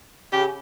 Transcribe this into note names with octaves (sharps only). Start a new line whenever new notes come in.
C#3 G4